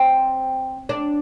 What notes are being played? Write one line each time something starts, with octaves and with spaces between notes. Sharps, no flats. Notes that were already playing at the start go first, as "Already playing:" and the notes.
Already playing: C4
D4